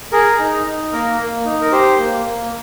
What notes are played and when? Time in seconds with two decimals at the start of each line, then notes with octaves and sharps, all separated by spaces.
0.12 G#4 A#4
0.39 D#4
0.66 D#4
0.92 A#3 A#4
1.19 A#3
1.45 D#4
1.61 A#4
1.72 G4 C5
1.98 A#3
2.25 A#3